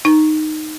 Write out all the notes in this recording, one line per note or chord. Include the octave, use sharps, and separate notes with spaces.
D#4